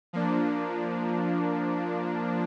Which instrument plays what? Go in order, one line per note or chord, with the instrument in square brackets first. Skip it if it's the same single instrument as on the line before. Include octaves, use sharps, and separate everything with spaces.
[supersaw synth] F3 A#3 D4